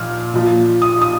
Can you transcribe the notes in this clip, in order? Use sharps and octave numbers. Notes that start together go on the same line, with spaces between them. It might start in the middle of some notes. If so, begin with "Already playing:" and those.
Already playing: A#2 F3 F6
A#2 F3
D#6
D#6